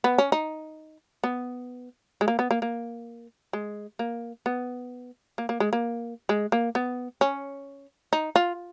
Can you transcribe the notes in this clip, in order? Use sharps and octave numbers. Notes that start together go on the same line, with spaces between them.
B3
C#4
D#4
B3
G#3
A#3
B3
A#3
A#3
G#3
A#3
B3
A#3
A#3
G#3
A#3
G#3
A#3
B3
C#4
D#4
F4